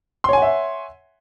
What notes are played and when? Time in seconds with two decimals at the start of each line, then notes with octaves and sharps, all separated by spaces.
0.24 C6
0.29 C#5
0.33 G#5
0.38 F#5
0.42 E5